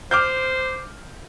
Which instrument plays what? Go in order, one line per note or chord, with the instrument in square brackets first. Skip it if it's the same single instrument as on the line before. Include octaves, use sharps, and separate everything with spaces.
[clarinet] C5 [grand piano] D6 F6 G6